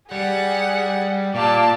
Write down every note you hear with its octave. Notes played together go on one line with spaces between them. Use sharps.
G3 G#4 F#5
A#2 G4 D5 F5 A5